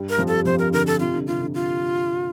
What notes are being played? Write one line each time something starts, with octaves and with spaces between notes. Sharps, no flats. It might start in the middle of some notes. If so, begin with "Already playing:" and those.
Already playing: G2 G3
A#4
F2 F3
A4
F2 F3 C5
A#4
D3 A#4
A4
C3 F4
D3
C3 F4
D3
F4